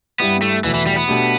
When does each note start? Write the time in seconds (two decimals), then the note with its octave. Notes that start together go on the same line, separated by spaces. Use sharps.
0.20 G2 G3 B3 E4 G4
0.42 A3
0.64 E2 B2 E3 A3 E4
0.74 E3
0.86 G3
0.97 B3
1.08 B2 A3 D4 G4